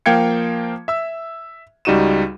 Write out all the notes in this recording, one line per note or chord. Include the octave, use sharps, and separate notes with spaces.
F3 A#3 F5 G5 G#6 C#7
E5 E6
C#2 G3 D#4 F#4 D#7 E7